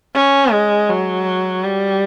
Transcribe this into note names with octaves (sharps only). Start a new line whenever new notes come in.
C#4
G#3
F#3
G3